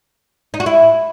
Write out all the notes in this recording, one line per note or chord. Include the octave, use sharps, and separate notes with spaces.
D#4
F#4
E4